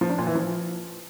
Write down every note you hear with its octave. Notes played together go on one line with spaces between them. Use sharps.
F3
D4
A#2
E3
F3